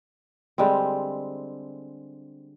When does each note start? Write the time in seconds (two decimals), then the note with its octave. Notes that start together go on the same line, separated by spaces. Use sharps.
0.58 D3 G3 G#3 C4